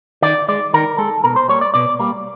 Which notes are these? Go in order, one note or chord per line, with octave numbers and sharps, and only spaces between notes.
D#3 D5
G#3 D5
D#3 A#4
G#3 A4
B2 A#4
C5
G3 A#3 C#5
D5
B2 D5
G3 A#3